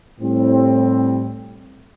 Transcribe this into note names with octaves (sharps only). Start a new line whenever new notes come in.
A2 G3 C4